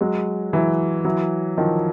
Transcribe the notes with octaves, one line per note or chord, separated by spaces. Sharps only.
F#3 G#3
E3 F#3
E3 F#3
D#3 F3